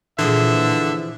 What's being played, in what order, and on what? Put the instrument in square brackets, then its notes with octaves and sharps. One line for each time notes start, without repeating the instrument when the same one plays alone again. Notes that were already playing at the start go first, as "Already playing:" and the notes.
[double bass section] A#2 [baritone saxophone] D3 [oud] E3 F3 G#4 [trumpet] E5